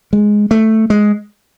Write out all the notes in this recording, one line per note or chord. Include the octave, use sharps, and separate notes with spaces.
G#3
A3
G#3